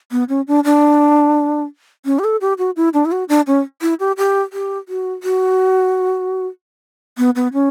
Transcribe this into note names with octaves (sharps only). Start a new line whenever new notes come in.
B3
C#4
D4
D4
C#4
G4
A4
G4
F#4
E4
D4
E4
F#4
D4
C#4
E4
G4
G4
G4
F#4
F#4
B3
B3
C#4